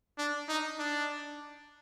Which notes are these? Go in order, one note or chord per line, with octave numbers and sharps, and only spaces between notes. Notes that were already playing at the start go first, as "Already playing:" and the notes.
D4
D#4
D4